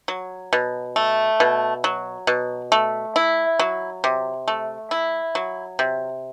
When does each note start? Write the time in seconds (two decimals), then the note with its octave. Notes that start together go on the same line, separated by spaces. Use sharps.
0.08 F#3
0.53 B2
0.96 A3
1.40 B2
1.84 F#3
2.27 B2
2.72 A3
3.16 E4
3.59 F#3
4.04 C3
4.48 A3
4.91 E4
5.35 F#3
5.79 C3